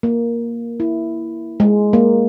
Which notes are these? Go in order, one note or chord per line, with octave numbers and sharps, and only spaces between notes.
A#3
E4
G#3
A#3